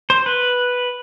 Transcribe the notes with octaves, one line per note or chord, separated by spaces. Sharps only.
C5
B4